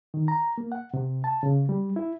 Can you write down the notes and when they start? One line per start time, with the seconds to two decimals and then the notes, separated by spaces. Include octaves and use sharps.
0.14 D#3
0.28 A#5
0.58 A#3
0.72 F#5
0.94 C3
1.24 A5
1.43 C#3
1.69 G3
1.96 E4